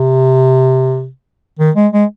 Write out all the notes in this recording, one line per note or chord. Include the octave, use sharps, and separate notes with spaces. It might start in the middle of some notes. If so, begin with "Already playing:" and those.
Already playing: C3
D#3
G#3
G#3